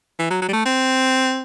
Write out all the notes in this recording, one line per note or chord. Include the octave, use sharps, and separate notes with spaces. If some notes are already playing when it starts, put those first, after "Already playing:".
E3
F#3
F#3
G3
A3
C4